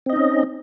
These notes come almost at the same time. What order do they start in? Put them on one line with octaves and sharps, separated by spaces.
C4 D#5 D#4 C#4